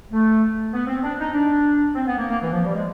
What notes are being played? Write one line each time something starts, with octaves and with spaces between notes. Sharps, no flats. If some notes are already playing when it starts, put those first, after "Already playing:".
A3
B3
C4
D4
D#4
D4
C4
B3
A#3
A#3
E3
F3
G3
G#3